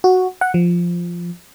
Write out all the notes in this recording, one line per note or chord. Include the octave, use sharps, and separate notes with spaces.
F#4
F#5
F3